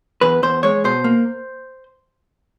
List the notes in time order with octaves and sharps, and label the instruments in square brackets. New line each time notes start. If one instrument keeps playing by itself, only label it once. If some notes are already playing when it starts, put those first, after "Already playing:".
[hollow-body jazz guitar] E2 B4
E2 C5
G#3 C#5
B2 C5
A#3